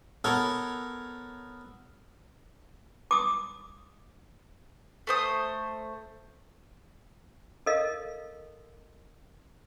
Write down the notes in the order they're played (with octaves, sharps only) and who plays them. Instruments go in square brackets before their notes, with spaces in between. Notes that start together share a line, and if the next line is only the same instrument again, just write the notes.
[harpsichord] B3 A4 A#4 C#5
[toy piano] D6 D#6
[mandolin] A3 C5 D#6
[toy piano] A4 A#4 D#5 F5